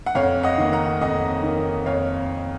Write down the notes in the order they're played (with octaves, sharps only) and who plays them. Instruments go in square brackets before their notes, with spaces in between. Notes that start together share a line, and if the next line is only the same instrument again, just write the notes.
[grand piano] F#5
F2 C#5 F5
D#5 F#5
D#3 A#3
F#5 A#5
F2 D#5 F#5
D#3 A#3
F2 C#5 F5